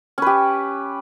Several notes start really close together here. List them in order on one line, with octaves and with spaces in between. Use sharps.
C#4 B4 G4